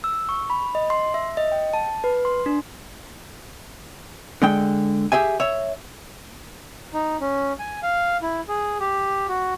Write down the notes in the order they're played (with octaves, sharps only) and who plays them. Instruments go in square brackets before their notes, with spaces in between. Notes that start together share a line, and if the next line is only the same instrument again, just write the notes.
[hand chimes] E6
C#6
B5
D#5
C6
E5
D#5
G5
A5
B4
C6
D4
[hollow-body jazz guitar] D3 G#3 G5
G4 G#4 E5 G#5
C#5 E5
[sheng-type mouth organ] D#4
C#4
G#5
F5
E4
G#4
G4
F#4